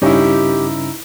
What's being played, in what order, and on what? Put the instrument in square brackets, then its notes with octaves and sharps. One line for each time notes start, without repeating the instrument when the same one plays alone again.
[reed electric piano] G2 C#3 C#4 [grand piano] D#4 E4 [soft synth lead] G4